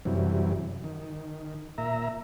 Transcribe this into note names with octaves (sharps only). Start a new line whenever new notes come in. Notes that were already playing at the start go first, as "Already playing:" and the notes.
F#2 C3 E3 G3
D#3
A#2 E5 A#5